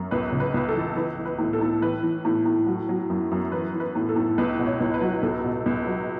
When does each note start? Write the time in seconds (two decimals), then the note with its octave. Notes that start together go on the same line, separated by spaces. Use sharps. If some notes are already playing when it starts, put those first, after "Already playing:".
Already playing: F#2
0.11 C#2 B4
0.32 C#3
0.40 B4
0.54 C#2 B4
0.68 A4
0.76 E3
0.96 E3 B4
1.18 E3
1.25 B4
1.38 A2
1.53 A4
1.61 A2
1.81 E3 B4
2.03 E3
2.25 A2
2.45 A2
2.67 F#3
2.89 F#3
3.10 F#2
3.31 F#2
3.52 E3 B4
3.74 E3
3.80 B4
3.95 A2
4.09 A4
4.16 A2
4.38 C#2 B4
4.59 B2
4.66 C#5
4.80 C#2
4.94 B4
5.01 F#3
5.23 C#2 A4
5.44 B2
5.66 C#2
5.87 F#3